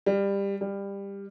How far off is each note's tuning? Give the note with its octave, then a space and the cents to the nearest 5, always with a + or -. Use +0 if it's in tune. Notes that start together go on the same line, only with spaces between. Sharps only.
G3 +20
G3 +20